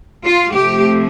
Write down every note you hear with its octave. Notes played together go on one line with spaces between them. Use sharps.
F4
C3 F3 A3 G4